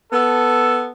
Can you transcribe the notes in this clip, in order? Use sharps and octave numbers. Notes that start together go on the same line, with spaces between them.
B3 A4